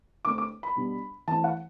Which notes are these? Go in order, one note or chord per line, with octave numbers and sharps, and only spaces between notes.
D3 A3 C4 D6
D6
B5
B2 G3 B3 D4
E3 A3 C4 A5
F#5